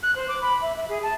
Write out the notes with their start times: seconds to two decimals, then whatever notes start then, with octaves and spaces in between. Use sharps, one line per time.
0.02 F#6
0.15 C5
0.28 D6
0.41 B5
0.61 E5
0.75 E5
0.89 G#4
1.02 A5